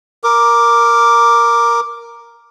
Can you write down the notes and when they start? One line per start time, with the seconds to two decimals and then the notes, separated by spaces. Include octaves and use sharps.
0.24 A#4 D6